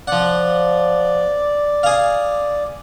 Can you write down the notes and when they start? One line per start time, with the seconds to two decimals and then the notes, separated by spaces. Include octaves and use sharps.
0.07 F3 D5 F#5
1.83 G#4 F5